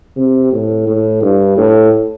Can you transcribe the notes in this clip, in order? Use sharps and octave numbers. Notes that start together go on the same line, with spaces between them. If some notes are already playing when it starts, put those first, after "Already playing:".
C3
A2
A2
G2
A2